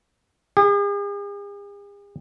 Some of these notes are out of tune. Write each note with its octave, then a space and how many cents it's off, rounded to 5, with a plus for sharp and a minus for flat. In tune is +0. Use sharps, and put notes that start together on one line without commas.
G#4 -45